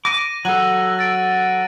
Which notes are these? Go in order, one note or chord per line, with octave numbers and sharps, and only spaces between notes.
D6 A#6 D#7
F#3 A4 F#6 D#7 F#7
A6 D7